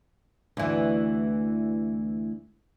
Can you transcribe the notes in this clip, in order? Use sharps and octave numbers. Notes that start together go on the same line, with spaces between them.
D2 E3